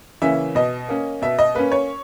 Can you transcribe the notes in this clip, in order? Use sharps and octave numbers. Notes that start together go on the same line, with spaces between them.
C#3 E3 A#3 C#4 E5
B2 D#5
A#3 C#4
B2 E5
D#5
A#3 C#4 B4
C#5